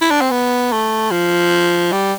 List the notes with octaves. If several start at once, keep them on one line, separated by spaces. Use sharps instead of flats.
E4
D4
C4
B3
A3
F3
G3